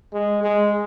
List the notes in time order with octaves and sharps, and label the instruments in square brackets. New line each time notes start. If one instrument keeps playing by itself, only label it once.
[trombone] G#3
G#3